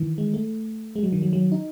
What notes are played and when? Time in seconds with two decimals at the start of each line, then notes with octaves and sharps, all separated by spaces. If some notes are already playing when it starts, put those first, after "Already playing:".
Already playing: D#3 E3
0.18 G#3
0.34 A3
0.96 G#3
1.03 F#3
1.12 D#3
1.22 F#3
1.33 F#3
1.52 D#4